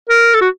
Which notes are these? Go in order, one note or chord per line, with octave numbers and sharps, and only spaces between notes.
A#4
A4
F#4